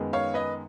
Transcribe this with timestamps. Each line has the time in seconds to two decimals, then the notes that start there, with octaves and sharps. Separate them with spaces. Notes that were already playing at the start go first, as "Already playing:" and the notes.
Already playing: F#2 D#3 G#3 B3
0.13 C#5 F5
0.34 B4 D#5